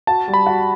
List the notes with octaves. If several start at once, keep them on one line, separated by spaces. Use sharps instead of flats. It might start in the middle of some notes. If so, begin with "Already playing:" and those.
F#4 A5
G3
B5
F#4